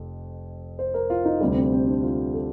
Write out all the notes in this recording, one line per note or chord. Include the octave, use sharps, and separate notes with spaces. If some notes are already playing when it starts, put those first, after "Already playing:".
Already playing: F1 F2
C5
A#4
F4
D#4
D2 C3 G3 D4
C4
C4
D4
F4
A4